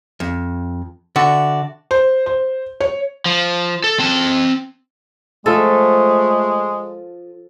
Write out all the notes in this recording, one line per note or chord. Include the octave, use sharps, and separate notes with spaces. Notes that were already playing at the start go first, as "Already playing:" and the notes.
F2
D3 F#4 D5 E5
C5
C5
C#5
F3
A4
C4 A5
F3 G#3 A3 F4 A4